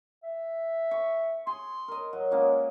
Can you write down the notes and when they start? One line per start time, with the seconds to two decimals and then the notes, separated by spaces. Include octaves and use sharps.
0.24 E5
0.91 C#6
1.47 G#4 C6
1.88 A#4 D#5
2.13 F#3
2.31 G#3 A#3 C#4 F4